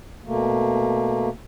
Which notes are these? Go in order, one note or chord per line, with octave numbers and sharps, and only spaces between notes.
B2 A3 A#3